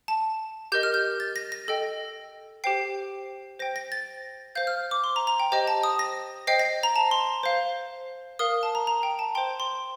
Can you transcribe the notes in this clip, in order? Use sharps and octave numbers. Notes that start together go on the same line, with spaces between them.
A5
G4 A#4 D#5 G6
F6
G6
A6
A#6
A#6
A4 D#5 G5
G4 C5 G5 C7
C5 G5 A#6
A#6
A6
C5 F5 G6
F6
D6
C6
A#5
A#5
G5
G4 C5 D#5 G5
A5
D#6
A#6
C5 D#5 G5 C7
A#6
A#5
A5
C6
C5 F5
A#4 F5 D#6
A5
A#5
A#5
G5
A5
C5 G5 C6
C6